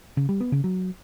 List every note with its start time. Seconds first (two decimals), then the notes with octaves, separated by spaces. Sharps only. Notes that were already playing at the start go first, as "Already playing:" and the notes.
0.17 C#3
0.29 G3
0.40 B3
0.52 C#3
0.64 F#3